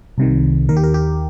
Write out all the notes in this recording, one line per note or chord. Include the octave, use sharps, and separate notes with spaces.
C2 C3 D#3
D#2 D#3 A#4
G4
A#4
G4